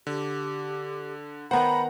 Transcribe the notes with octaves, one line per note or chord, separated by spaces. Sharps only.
D3 G4
D#3 B3 C5 F#5 A#5 B5